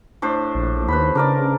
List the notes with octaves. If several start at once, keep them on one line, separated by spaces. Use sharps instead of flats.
A2 D4 C5
A#1
D#2 B4 C5 B5
C#3 D4 A#4 D5